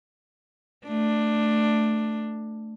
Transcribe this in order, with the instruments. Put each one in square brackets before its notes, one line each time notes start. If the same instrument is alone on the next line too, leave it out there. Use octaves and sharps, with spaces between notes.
[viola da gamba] A3 D4